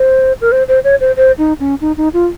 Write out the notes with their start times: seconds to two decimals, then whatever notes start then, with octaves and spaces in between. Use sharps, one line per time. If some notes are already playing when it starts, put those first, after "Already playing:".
Already playing: C5
0.41 A#4
0.52 C5
0.68 C5
0.84 C#5
1.00 C5
1.17 C5
1.38 D#4
1.60 C#4
1.81 D#4
1.97 D#4
2.13 F4